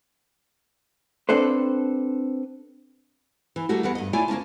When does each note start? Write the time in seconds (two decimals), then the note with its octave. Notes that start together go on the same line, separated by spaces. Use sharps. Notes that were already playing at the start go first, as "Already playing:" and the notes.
1.29 C4 D4 A4 B4 C5
3.56 E3
3.69 G3 A3 A#3 F#4
3.83 E2 G3 B4 F#5
3.95 G2 D#5
4.13 A3 E4 F4 C#5 D5 G#5
4.28 D2 A#3 C#4 A5